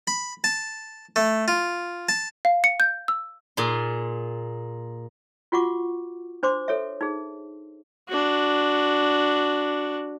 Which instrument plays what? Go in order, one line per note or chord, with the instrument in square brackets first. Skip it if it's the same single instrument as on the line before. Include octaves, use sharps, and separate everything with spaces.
[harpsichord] B5
A5
A3
F4
A5
[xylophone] F5
C#7
G6
E6
[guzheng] A#2 G#4 C6
[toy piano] F4 F#4 F#5 C#6 D6
D4 C5 C6 D6
A4 C#5 E5
D#4 G#4
[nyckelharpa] D4 F#4